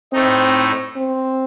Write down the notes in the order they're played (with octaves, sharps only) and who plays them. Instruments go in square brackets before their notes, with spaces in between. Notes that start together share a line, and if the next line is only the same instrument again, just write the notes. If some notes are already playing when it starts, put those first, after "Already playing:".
[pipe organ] A2 A3 D#4 [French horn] C4
[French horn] C4